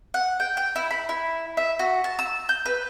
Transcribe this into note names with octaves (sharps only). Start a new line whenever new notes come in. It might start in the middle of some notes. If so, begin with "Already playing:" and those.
F#5
G5
G5
E4
B5
E4
E5
F#4
A5
E6
G6
B4